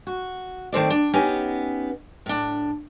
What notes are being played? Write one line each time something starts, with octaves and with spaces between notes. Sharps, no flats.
F#4
D#3 A3 C4 D5
D4
B3 C#4 D#4 G4
A2 D4